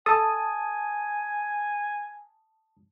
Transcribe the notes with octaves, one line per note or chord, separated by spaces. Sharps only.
A4 G#5 A5 D#6